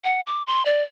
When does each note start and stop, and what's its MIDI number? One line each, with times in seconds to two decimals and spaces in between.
0.04 0.21 78
0.27 0.43 86
0.47 0.65 84
0.65 0.82 74